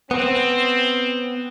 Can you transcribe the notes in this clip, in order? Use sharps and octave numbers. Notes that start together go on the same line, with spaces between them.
B3 C4